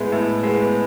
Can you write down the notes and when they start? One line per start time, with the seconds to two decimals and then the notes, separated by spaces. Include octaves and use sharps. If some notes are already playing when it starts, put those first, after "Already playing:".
Already playing: A2 G#3 B3
0.12 A2
0.43 G#3 B3